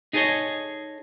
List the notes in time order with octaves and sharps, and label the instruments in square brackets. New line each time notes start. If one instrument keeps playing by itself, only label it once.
[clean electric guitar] D#4 G#4 A4 B4 C#5 D#5